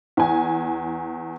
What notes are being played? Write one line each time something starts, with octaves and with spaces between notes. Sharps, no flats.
E2 G#5